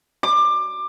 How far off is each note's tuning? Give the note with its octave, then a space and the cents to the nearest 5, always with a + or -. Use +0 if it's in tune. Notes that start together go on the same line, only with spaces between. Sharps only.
D6 +20